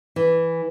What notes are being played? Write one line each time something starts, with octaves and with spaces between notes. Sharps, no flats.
E3